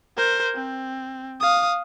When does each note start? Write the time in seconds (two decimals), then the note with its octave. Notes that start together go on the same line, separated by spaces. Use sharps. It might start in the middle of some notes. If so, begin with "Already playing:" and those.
0.17 A#4 C5
0.55 C4
1.40 F5 D#6